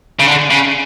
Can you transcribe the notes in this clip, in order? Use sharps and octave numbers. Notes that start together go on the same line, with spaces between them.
C#3
D3
C#3